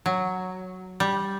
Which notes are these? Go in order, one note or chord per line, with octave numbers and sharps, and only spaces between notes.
F#3
G3